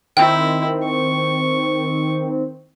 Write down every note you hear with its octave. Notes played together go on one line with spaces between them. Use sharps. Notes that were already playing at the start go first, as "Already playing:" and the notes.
D#3 C4 E4 G5
C#6